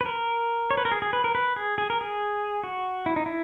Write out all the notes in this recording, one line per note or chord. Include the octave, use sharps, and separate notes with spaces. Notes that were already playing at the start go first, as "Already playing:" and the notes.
B4
A#4
C#5
B4
A#4
G#4
G#4
B4
A#4
B4
G#4
G#4
A#4
G#4
F#4
E4
D#4
E4